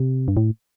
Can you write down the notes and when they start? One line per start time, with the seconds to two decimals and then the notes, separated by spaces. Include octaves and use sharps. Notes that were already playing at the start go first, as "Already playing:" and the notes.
Already playing: C3
0.28 G2
0.37 A2